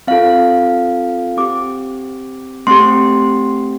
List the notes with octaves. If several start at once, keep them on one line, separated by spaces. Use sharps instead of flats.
C4 F4 A4 F5
C4 G4 D6
A3 C4 G4 C6